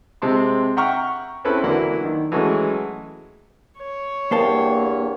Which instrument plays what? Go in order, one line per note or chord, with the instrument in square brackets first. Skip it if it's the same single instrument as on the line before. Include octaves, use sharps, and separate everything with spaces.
[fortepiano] C3 G#3 C4 A5 C6
E5 F#5 G5 A#5 C#6 F6
C4 C#4 E4 A4 B4
D3 E3 F#3 A#3 D4 E4
D#3
E3 F#3 G#3 A3 C#4
[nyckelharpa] C#5
[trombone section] E2 G2 [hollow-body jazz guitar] A#3 C5 A5 [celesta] A#4 F5 G5